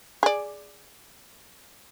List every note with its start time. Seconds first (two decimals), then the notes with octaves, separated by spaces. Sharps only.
0.23 G#4 D5